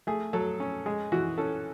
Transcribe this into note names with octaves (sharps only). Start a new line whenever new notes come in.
A3 G#4
F#3 A4
C#4
G#3 G#4
E3 F#4
C#4 A4